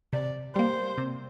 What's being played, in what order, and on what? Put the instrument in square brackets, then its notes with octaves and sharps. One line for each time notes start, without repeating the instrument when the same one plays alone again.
[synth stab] C3 [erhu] D5
[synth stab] G3 A#3 [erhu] C5
[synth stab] C3